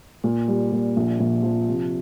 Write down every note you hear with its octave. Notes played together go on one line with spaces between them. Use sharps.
A#2
G3
A#2
A#1
A#1
F3
C3